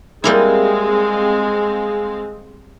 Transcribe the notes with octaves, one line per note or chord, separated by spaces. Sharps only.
G3 G#3 A#3 C4 E4 G#4 F5